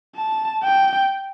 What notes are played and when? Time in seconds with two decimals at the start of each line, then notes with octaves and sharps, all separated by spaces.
0.16 A5
0.64 G5